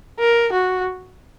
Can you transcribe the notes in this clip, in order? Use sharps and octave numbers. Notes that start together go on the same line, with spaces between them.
A#4
F#4